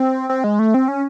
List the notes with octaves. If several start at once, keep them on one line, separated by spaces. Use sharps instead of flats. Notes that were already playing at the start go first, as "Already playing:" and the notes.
Already playing: C4
C4
G#3
A3
C4
C#4